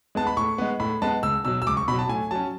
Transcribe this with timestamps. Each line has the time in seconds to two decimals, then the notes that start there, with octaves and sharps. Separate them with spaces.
0.15 G#3 B3 A5
0.27 B5
0.37 A2 C#6
0.58 G#3 B3
0.80 A2 B5
1.02 G#3 B3 A5
1.23 C#2 E6
1.45 B2 F#3 E6
1.62 E6
1.67 C#2 D6
1.77 C#6
1.88 B2 F#3 B5
1.99 A5
2.09 A2 G#5
2.31 F#3 C#4 A5